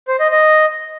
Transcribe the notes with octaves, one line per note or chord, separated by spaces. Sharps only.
C5
D#5
D#5